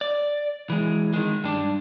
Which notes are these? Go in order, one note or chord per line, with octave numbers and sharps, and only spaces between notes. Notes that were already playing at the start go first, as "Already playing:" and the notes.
D5
E3 G#3
D#3 G#3
G2 D4